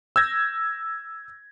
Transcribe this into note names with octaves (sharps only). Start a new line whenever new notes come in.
E6 G6 G#6 A#6